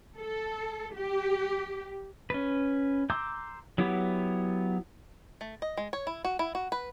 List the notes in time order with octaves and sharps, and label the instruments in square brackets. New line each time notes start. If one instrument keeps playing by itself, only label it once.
[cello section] A4
G4
[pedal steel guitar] C#4 B4
A#5 C6 D6 E6 G6
F#3 B3 E4 G4
[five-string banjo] A3
D#5
G#3
C#5
E4
F#4
E4
F#4
B4